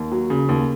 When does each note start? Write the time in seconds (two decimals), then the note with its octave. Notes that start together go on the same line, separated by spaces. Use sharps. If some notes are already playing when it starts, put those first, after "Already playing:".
Already playing: D#2
0.12 F#3
0.30 C#3
0.49 D#2